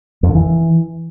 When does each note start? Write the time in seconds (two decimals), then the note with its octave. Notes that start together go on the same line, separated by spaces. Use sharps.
0.23 F2
0.29 D3
0.35 E3